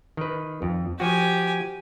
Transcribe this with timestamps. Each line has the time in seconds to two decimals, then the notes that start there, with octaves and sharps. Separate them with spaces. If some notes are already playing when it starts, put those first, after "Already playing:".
0.17 D#3 B4
0.62 F2
1.00 F3 F#4 G4 G#5